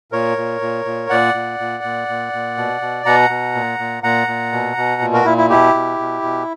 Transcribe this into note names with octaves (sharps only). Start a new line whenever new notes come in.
A#2 A#4 C#5
A#2
A#2
A#2
A#2 D5 F#5
A#2
A#2
A#2
A#2
A#2
B2
B2
B2 F#5 A#5
B2
A#2
A#2
A#2 F#5 A#5
A#2
B2
B2
A#2
F#4 A#4
A#2 E4
E4
B2 E4 G4
B2
B2
B2